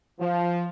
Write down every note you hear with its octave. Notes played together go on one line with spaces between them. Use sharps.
F3